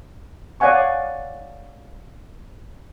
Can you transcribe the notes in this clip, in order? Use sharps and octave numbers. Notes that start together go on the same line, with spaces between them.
C#5 D5 F5 F#5 G#5 C#6